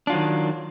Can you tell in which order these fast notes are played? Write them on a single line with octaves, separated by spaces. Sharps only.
D4 F4 F#3 D#3